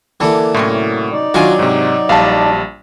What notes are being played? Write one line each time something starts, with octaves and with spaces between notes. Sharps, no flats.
D3 E3 A#3 E4 A4
A2 C3 F#3 C#4
D#4 D5
D#3 F#3 D4 F4 F#4 C#5 G#5
G#2 C3
A#1 G3 F5 A5